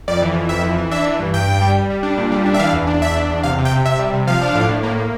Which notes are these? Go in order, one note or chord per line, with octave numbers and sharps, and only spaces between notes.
F2 D5
E3
F2
F2 E5
E3
E3
D4 E5
E3
G2
G2 G5
G2
G3
G3
G3
D4
A#2
G3
D4
E5
E3 F5
E2
D4
E2 E5
D4
E2
C3 F5
C3
G5
C3
C3 E5
G3
C3
F3 F5
D4
A2
A2
A#3
A#3